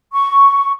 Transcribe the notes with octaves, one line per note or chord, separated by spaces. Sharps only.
C#6